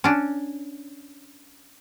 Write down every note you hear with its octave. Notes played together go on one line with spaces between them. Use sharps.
C#4 D4